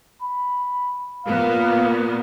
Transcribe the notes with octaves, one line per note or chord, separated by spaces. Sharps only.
B5
A#2 A#3 B3 F5